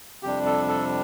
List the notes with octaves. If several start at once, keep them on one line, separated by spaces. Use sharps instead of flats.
F2 C3 G3 D4 G4
A4
A4